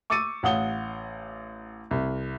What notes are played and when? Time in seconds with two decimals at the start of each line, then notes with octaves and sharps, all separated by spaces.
0.10 C#6 D6 E6 A6 C#7 D#7
0.43 A1 F5 F#5 D#6 G7
1.91 C2